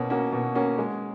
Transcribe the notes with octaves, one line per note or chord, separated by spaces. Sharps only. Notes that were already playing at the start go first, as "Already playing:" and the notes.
Already playing: B2 A#3 C#4
A#3 C#4 F#4
B2
A#3 C#4 F#4
G#3